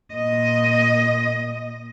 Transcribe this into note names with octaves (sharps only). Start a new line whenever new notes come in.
A#2 D#5